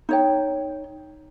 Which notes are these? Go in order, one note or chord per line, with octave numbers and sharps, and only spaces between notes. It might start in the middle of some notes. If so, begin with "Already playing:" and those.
D#4 C#5 G5